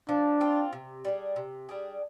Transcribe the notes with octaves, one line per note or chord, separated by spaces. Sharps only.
F3 D4
C4 F4
C3
G3 D4 G#4
C3
G3 D4 G#4